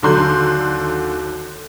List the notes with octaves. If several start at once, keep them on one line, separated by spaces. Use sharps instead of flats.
D#2 D3 F#3 C6 F#6 G6